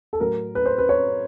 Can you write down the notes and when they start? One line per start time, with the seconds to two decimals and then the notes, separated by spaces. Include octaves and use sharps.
0.13 A4
0.20 A2 F#3 A#4
0.55 B4
0.66 C5
0.78 B4
0.89 C#5